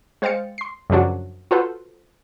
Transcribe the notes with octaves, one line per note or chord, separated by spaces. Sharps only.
G#3 C5 F5 G5 A6 C#7
C6 C7
F#2 C#3 F3 F#3 D4 F#4
F4 F#4 A4 B4 C5